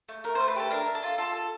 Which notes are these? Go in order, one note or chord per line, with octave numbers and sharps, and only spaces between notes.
A3
A3 A#4
C5
A3
B4
G4 A4
D4 A#4
D4
A4
F4
F4 A4
A4